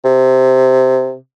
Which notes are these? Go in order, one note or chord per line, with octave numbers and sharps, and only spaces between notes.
C3